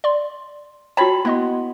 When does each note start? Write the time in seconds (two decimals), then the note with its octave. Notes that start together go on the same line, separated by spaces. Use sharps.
0.04 D5 C6
0.97 F#4 C#5 G5 A5 B5
1.25 B3 E4 D#5 C6